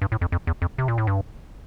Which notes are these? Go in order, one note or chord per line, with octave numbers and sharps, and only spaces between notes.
G2
A2
F2
F2
E2
F2
C3
A#2
A2
G2